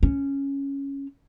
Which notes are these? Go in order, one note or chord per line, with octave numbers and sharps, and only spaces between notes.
C#4